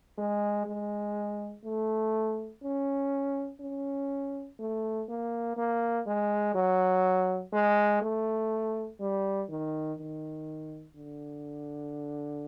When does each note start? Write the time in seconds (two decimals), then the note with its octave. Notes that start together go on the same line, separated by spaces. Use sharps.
0.18 G#3
0.67 G#3
1.65 A3
2.63 C#4
3.61 C#4
4.59 A3
5.09 A#3
5.57 A#3
6.07 G#3
6.55 F#3
7.53 G#3
8.02 A3
9.00 G3
9.49 D#3
9.99 D#3
10.96 D3